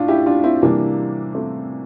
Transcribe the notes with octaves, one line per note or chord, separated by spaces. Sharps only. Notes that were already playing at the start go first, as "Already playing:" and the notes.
Already playing: A2 D4 F4
E4 G4
D4 F4
C4 E4
C3 E3 G3 A#3 D4
A3 C4